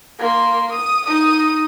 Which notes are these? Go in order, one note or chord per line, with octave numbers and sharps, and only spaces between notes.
A#3 C6
D#6
D#4 D#6